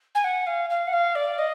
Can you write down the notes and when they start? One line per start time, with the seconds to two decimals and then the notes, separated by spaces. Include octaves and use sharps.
0.15 G#5
0.24 F#5
0.47 F5
0.70 F5
0.87 F#5
0.93 F5
1.15 D5
1.38 D#5